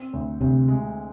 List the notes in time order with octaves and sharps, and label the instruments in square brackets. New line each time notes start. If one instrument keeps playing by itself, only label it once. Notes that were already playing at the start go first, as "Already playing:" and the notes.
Already playing: [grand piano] C4
D2
[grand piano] D2 [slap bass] C3
[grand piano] G#3